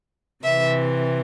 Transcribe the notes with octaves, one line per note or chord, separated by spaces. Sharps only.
C3 E3 E5